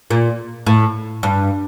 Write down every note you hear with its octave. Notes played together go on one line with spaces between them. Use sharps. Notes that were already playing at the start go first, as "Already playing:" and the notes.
A#2
A2
G2